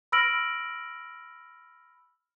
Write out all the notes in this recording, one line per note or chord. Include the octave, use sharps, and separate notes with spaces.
B5 E6 F6 A#6 D7 F#7